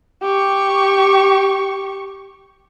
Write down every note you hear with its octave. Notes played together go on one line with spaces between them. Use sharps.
G4 C#6